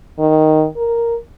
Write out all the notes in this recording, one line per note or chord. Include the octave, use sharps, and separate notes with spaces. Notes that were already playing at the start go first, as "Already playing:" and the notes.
D#3
A#4